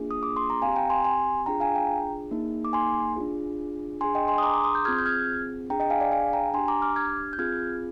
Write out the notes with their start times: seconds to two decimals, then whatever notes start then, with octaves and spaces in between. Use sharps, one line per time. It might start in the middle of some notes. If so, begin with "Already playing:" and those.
Already playing: A#3 D4 F4 G#4
0.11 D#6
0.23 D6
0.36 C6
0.50 A#5
0.62 C4 G4 F5 G#5
0.76 G5 A#5
0.90 G#5 C6
1.04 G#5 C6
1.46 D4 F4 G#4 G5 A#5
1.60 F5 G#5
1.76 G5 A#5
2.31 A#3 D#4 G#4
2.65 D6
2.73 G#5 C6
3.16 D4 F4 G#4
4.00 D4 G#5 C6
4.04 G#4
4.15 D#5 G5
4.28 G#5 C6
4.38 D#6
4.43 A#5 D6
4.53 A#5 D6
4.64 C6 D#6
4.75 D#6 G6
4.85 C4 F4 G#4 F6 G#6
4.98 G6
5.06 F6 G#6
5.70 D4 G#4 G5 A#5
5.80 D#5 G5
5.90 F5 G#5
6.01 D5 F5
6.12 F5 G#5
6.33 G5 A#5
6.54 D4 G#5 C6
6.58 G4
6.68 A#5 D6
6.82 D6 F6
6.96 F6 G#6
7.33 G6
7.38 C4 F4 G#4 F6 G#6